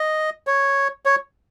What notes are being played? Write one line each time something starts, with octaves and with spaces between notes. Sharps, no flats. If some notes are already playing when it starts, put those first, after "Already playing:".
Already playing: D#5
C#5
C#5